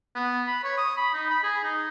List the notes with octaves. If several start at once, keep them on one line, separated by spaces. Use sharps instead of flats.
B3
B5
C#5
D#6
B5
D#4
B5
G#4
D#4